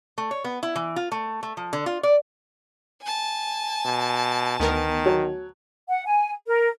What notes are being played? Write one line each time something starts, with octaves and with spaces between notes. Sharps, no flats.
A3
C#5
B3
E4
E3
F4
A3
A3
F3
D3
F4
D5
G#5 A5
B2
D2 D#3 B3 A#4
F#3
F#5
G#5
A#4